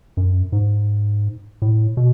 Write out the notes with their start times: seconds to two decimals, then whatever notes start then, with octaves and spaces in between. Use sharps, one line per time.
0.17 F#2
0.52 G#2
1.62 A2
1.97 B2